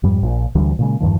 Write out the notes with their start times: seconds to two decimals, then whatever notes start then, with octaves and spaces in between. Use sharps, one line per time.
0.03 F2 G#2 G3
0.23 A#1 A#2
0.55 D2 D3 E3 G3
0.79 A#2 C#3 G#3
1.00 E2 G2 D#3 F3